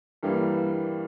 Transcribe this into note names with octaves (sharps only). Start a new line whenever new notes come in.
G2 E3 G3 A#3